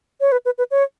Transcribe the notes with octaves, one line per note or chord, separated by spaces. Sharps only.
C#5
B4
B4
B4
C#5